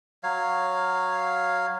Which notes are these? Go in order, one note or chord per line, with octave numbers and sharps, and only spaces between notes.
F#3 C#5 F5